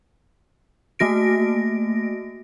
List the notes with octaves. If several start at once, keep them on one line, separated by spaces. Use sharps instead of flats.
A3 A#3 F#4 A#6 D7